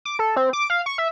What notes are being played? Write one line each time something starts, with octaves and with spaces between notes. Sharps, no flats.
D6
A4
C4
D6
F5
C#6
E5